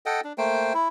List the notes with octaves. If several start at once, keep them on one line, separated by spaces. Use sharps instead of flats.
A4 D#5 F#5 G5
D4
A3 A#3 C5 G5
E4